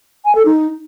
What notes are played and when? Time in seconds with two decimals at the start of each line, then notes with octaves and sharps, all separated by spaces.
0.25 G#5
0.35 A4
0.45 D#4